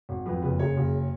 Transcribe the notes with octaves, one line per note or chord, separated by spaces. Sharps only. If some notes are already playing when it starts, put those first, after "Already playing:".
G#1
F2 B4
F#1 B4
C#3 C#5
F#1